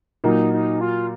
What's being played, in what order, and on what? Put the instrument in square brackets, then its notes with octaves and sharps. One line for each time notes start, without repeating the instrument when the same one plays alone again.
[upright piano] A#2 F#3 A#3 [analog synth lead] D#4
[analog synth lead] D#4
F4